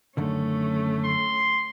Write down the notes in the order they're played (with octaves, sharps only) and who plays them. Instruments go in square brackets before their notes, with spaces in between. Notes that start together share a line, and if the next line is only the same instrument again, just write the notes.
[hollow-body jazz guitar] F#2 D3 D#3 [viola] A3 C#4
[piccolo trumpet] C6